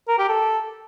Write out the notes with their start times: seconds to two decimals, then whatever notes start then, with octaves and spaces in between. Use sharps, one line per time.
0.09 A#4
0.19 G4
0.29 A4